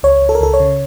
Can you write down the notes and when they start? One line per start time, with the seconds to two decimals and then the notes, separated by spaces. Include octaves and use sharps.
0.03 C#2 C#5
0.22 C#2
0.29 A4
0.35 A#4
0.41 C#2 A4
0.54 C#5
0.60 C#3